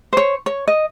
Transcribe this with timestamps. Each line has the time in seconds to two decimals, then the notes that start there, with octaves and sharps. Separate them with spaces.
0.13 C5 C#5
0.46 C#5
0.68 D#5